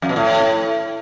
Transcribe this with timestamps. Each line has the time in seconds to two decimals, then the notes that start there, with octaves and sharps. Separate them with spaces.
0.02 F2
0.09 B2
0.16 A2